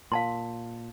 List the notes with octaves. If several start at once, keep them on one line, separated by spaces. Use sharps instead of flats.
A#2 F5 A5 C6